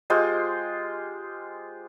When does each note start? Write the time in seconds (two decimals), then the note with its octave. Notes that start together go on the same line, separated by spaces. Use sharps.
0.10 G#3 F4 G4 C5